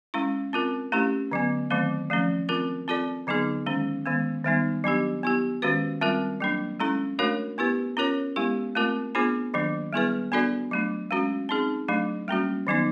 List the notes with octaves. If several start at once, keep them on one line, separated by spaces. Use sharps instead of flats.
G#3 C#4 E4
C4 F4 A#4
A3 C#4 E4 G4
D3 F#3 B3
D#3 F#3 A3 C4
F3 A3 C#4
C4 F4 A#4
C4 F4 A4 D5
D3 F#3 B3 D#4 G#4
D#3 G#3 C#4
D#3 G#3 B3
D#3 G3 B3 D#4
F#3 B3 D4 G4
B3 E4 G4
D#3 G#3 C#4 F#4 B4
G3 C4 F4 A#4
F#3 A#3 D4
G#3 C#4 E4 A4
A3 D4 F#4 A#4 C#5
B3 E4 G4 B4
C#4 F4 A#4 C#5
G#3 B3 E4 G4
A3 C4 F4 A#4
B3 D4 F4 G#4 C5
D#3 F#3 A#3 D4
G3 B3 E4 G#4 B4
B3 D4 F#4 A4 D5
F#3 A3 D4
G#3 C#4 F#4
C4 D#4 G#4
F#3 A3 D4
G3 A#3 C#4 F#4
D#3 F#3 B3 D#4